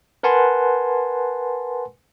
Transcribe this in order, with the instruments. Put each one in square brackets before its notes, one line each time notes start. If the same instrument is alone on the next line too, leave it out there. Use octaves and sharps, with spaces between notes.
[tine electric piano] A#4 B4 F#5 G#5 A5 C6